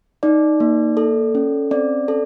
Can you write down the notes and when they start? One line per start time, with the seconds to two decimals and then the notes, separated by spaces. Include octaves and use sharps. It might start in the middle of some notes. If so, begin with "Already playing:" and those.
0.23 D#4 D5
0.60 A#3
0.97 A4
1.35 C#4
1.71 C4 D5
2.08 A4